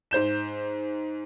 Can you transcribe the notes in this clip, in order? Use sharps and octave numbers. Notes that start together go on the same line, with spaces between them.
G#2 C5 G6 E7